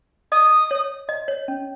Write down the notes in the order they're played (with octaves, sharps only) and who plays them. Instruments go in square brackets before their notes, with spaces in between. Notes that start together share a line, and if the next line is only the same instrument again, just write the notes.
[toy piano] D#5 [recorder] D#6
[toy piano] C#5
D#5
C#5
C#4